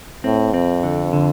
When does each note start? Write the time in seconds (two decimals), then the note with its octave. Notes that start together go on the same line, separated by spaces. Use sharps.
0.24 A2 C4
0.53 F2 C4
0.83 D3
1.13 D3